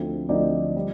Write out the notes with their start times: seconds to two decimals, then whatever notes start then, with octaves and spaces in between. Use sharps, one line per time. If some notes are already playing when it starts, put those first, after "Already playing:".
Already playing: D2 D3 F3 C4 D#4
0.29 D2 D3 F3 C4 D#4 D5
0.76 G3